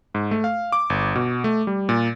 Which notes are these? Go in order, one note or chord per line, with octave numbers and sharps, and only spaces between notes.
G#2
A3
F5
D6
G1
B2
A3
G3
A#2